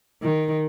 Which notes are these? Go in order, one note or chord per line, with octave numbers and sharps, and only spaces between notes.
D#3